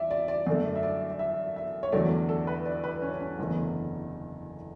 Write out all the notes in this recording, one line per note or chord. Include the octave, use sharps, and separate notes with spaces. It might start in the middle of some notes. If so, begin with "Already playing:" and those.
Already playing: E2 D5 E5
D5
D5
F#2 D3 A3 D5
E5
D5
D5
E5
E5
C#5
E2 D3 F#3 A3 D5
A4
B4
D5
B4
C#4
C#4
F#1 E2 D3 A3